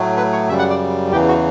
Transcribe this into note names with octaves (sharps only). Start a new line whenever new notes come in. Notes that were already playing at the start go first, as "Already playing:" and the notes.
Already playing: A2 F#3 A3
B4
C#5
F#2 C#3 G3 E5
F#5
D5
E2 C#3 E3 G4
F#4